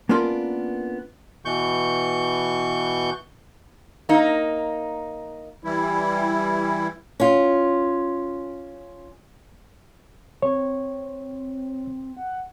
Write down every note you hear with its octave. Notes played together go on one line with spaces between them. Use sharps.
A#3 B3 C#4 D4 F4 A#4
B2 E3 C#6 G6
A#3 D#4
E3 G3 E4
C#4 F4
C4 C#5
F#5